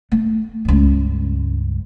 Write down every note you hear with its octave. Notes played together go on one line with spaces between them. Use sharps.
A3
C#2 G2